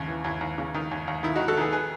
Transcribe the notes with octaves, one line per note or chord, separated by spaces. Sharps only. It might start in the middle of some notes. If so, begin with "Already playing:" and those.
Already playing: D#2 C#3
E3
D#2 E4
D#2
C#3
D#3
D#2
D#2
D#3 E4
D#3 D#4 F#4
F#4 A4
D#3 G#4 B4
G#4 B4